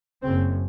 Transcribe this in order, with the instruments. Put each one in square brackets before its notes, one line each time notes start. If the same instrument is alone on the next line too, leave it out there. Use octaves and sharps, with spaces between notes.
[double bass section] F#1 F#2 C#3 C4